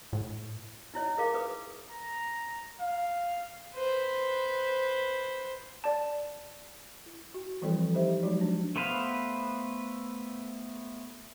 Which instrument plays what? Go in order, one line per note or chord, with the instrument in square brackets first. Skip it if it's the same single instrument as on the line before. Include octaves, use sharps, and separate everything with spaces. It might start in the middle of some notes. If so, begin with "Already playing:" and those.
[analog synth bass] A2
[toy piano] D#4 E4 C#5 D#5
E4 G#4 A#4 F5 D6
G#4 B4 D#6
[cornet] A#5
F5
[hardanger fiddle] B4 C5
[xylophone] D5 A5
[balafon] E4
F#4
E3 F3 G3 C4 E4 A4
D#4 G4 C5 D#5 E5
F3 F#3 G#3 D#4 F#4
D4
[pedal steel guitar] A3 B3 B4 C5 F5